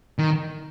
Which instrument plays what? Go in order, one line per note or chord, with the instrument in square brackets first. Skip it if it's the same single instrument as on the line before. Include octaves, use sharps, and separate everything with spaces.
[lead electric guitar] D#3